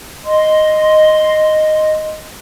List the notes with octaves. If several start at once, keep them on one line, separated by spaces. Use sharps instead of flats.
D#5 C6